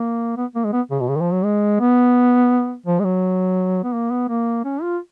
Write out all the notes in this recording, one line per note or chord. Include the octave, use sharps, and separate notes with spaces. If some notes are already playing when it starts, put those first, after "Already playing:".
Already playing: A#3
B3
A#3
G#3
B3
C#3
B2
C#3
D#3
F3
F#3
G#3
B3
F3
G#3
F#3
B3
A#3
B3
A#3
C#4
F4